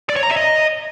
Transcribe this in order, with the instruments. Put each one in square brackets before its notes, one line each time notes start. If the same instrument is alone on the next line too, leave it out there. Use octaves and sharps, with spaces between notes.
[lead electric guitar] D5
C#5
A#5
E5
D#5